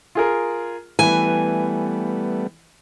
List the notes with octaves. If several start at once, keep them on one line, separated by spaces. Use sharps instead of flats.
F4 G#4 A#4
E3 G3 A3 B3 B4 G#5